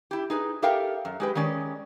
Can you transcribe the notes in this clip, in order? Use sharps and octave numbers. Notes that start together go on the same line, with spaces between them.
E4 G4
D#4 G#4 B4
G4 A4 A#4 E5 F5 G5
F#2
G#3 G4 B4
D#3 G#3 C#4 D5